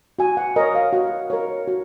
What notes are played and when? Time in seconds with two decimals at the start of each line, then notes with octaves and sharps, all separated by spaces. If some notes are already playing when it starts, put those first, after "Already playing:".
0.19 F#4 G#5
0.37 F#5
0.56 A#4 C#5 D#5
0.75 F5
0.93 F#4 F#5
1.30 A#4 C#5
1.68 F#4